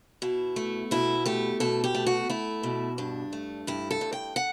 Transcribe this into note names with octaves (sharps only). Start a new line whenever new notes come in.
B2 E4
A3
B2 E4
A3 G4
B2 A4
G4
A3
F#4
A3 E4
B2
G2 D4
A3
G2 E4
A4
G2
G5
F#5